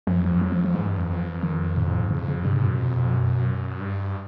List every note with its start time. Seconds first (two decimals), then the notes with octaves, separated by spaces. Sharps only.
0.07 F#2 F3
0.19 F2
0.25 F3
0.30 E2
0.37 F#2
0.41 F2 F#3
0.52 F3
0.64 F3
0.75 G#2 E3
0.87 G2
0.98 F2
1.10 F2
1.43 D#3
1.77 A2
1.88 A2
1.99 G#2
2.11 F2 C#3
2.28 C#3
2.44 G2 C3
2.56 G#2
2.62 B2
2.67 F#2
2.78 F2
3.12 F#2
3.80 G2